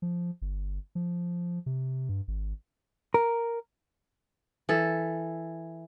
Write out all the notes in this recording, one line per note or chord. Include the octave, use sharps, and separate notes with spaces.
F3
G1
F3
C3
G2
G#1
A#4
E3 A4